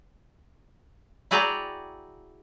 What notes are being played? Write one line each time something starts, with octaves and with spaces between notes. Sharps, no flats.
E4 F#4 G#4 D5 G5 A#5